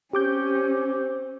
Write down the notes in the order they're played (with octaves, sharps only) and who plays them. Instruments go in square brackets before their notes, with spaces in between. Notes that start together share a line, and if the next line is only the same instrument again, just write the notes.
[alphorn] C4 [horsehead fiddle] C#4 [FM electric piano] G4 D6 G6